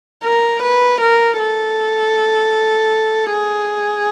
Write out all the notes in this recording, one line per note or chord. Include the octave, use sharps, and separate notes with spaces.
A#4
B4
A#4
A4
G#4